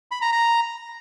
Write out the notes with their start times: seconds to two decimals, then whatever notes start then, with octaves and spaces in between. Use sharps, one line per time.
0.11 B5
0.22 A#5
0.32 A#5